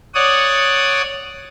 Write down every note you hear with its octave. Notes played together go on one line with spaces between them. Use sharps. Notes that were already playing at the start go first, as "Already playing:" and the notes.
C#5 D5 F#5 D#6